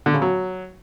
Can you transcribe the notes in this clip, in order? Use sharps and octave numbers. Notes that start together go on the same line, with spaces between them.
D3
C#3
F#3